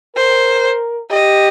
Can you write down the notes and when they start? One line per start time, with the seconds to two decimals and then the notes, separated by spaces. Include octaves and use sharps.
0.16 A#4 C5
1.11 G4 D#5